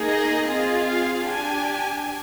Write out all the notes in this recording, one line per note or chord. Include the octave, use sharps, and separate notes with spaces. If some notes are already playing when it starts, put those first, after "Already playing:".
Already playing: A#3 D#4 G#4
D#5
C4 F4 G#4 D#5
F5
D4 G4 G#5